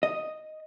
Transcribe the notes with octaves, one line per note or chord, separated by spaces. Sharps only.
D#5